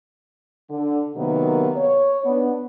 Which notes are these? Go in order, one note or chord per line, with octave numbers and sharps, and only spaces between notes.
D3
C3 D#3 F#3 A#3 B3
C#5
B3 D4